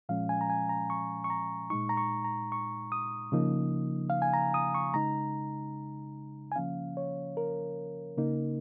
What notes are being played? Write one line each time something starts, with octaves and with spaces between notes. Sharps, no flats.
A#2 F3 G#3 C#4 F5
G#5
A#5
G#5
A#5
C#6
C#6
A#5
A#2 G#3 D#4 C#6
A#5
C#6
A#5
C#6
D#6
C#3 F3 A#3 D#4
F5
G#5
A#5
D#6
C#6
C#3 G#3 D#4 A#5
G#5
C#3 F3 A#3 C#4 F5
C#5
A#4
C#3 A#3 D#4